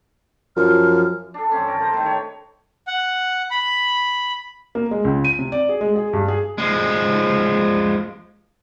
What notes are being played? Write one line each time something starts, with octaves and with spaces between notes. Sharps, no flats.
F#2 F3 F6
D4 A4
G2 E3 C4 C#4
D3 A#4
A4 B4 C5 A#5
A2 D#3
C#5
F#5
B5
A#3
G#3
C#2
D#7
C3
D5
G#4
G#3
G#4
G2
G#4
F3 G#3